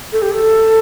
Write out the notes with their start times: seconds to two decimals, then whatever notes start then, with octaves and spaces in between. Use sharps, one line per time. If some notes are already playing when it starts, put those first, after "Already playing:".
0.12 A4
0.22 G4
0.32 A4